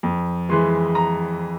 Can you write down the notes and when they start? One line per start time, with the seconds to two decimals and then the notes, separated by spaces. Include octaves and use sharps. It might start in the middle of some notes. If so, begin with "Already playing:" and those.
0.03 F2
0.49 E3 G#3 C6
0.95 A#5